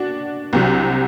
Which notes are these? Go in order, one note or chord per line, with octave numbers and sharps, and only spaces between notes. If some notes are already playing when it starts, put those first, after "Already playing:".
Already playing: D4 F#4
C2 C3 F#3